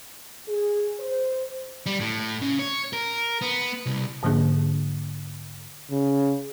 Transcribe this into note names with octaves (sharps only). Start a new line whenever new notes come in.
G#4
C5
G3
A2
C#3
C#5
A#4
B3
C2
G#2 D3 F3 A#3 D4 G#4
C#3